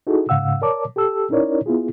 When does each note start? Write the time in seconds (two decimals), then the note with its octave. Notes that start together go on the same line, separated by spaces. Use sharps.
0.07 D#4 E4 F#4 G#4 A4
0.29 G#2 C#3 F5 F#5 E6
0.62 A#4 C#5 D5 A5 D6
0.96 G4 A4 A5 E6
1.30 C#4 D#4 E4 A#4 C#5 D5
1.66 B3 E4 F4 G#4